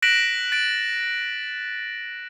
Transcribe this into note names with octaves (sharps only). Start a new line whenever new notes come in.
F#6 A#6 B6 D7 E7 F#7
A6 D7